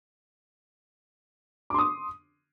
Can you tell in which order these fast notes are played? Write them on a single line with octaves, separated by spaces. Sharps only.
D6 C6 D#6